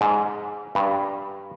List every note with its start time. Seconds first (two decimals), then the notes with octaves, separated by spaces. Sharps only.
0.01 G#2
0.75 G2